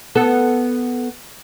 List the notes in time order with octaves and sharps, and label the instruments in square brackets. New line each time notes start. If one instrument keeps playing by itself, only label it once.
[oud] B3 A4